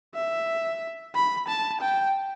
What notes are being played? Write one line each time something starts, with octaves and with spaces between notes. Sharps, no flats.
E5
B5
A5
G5